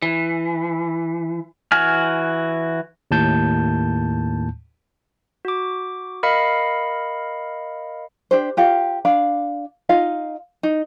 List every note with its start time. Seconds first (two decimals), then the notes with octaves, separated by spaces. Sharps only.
0.02 E3
1.72 E3 F#4 G#5 F6
3.11 D#2 A2 A5 G6
5.45 F#4 D6
6.23 A#4 D#5 F5 B5 C#7
8.31 D4 G4 C5
8.57 F4 G4 F5
9.05 D4 F5 B5
9.89 D#4 F4 D#5 F5
10.63 D#4